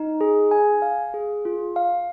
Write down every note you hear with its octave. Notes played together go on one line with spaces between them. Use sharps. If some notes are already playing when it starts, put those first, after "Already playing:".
Already playing: D#4
G#4
G#5
F5
G#4
F4
F5